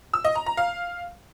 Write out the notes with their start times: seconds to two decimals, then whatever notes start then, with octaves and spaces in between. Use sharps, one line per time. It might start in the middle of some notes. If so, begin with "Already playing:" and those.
0.13 E6
0.24 D#5
0.35 A#5
0.46 A#5
0.57 F5